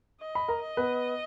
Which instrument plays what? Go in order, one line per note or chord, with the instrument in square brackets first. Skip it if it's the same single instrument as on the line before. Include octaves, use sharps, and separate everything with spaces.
[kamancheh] D#5
[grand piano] B5
A#4 A#5
[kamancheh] D#5
[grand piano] B3 B4